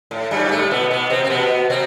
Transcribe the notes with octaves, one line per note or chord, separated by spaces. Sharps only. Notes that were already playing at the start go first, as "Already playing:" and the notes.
A2
G2 G3
A2 A3
B2 B3
B2 B3
C3 C4
C4
B2 B3
C3 C4